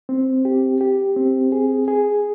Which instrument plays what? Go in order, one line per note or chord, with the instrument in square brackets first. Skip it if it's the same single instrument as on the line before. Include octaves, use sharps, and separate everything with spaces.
[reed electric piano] C4
G4
G4
C4
G#4
G#4